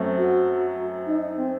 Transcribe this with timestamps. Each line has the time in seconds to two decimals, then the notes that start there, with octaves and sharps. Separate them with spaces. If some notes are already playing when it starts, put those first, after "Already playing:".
Already playing: F#2 F#3 A3 C4
0.17 F#4
1.07 D#4
1.21 D#4
1.37 C4